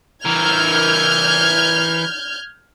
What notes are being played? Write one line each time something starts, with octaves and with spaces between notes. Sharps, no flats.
E3 A#4 F6 G6 G#6